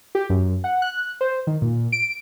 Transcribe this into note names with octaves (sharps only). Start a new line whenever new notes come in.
G4
F#2
F#5
F#6
C5
D#3
A#2
D7